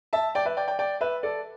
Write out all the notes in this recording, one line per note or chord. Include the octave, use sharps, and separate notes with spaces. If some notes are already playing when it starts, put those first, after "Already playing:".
E5 A5
D5 G5
B4 E5
D5 G5
D5 G5
D5 G5
B4 E5
A4 D5